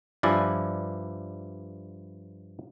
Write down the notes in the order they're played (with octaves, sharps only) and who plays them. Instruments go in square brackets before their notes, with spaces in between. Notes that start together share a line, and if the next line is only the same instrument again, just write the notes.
[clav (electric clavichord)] G2 F3 E4 D5 G#5